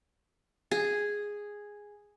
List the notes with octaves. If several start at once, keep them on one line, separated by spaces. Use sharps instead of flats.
G#4